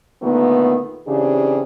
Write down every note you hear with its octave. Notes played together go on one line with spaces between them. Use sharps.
A#2 D3 D#3 A3 B3
C#3 E3 C4 D4 G4